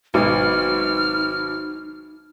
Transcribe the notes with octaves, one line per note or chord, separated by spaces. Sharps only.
G#1 B2 F#3 D#4 F6